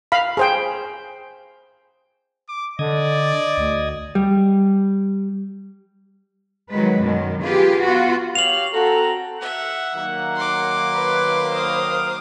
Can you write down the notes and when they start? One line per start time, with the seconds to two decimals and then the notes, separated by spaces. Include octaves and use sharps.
0.12 F5 B5
0.37 G#4 C5 G5
2.49 D6
2.79 D3 D5 D#5 D#6 G#6
3.58 D2
4.15 G3
6.70 D#3 F#3 G#3 B4
7.00 F#2 B2 D#3
7.42 F4 G4 G#4 B4
7.83 B3 F4 F#4
8.35 G4 C#5 F5 F7 F#7
8.74 C4 F#4 A4 A5 A#5
9.41 E5 F#5
9.94 D#3 F#3 A#3
10.36 C6 D6
10.94 B4
11.53 C5 D#6 F6